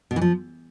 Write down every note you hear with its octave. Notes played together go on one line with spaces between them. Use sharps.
B2
E3
F3